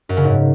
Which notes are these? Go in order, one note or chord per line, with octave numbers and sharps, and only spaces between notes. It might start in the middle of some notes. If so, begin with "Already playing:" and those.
F#2
C#3
G#2